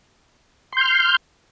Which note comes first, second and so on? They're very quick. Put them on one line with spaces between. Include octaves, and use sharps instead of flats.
C6 G6 F6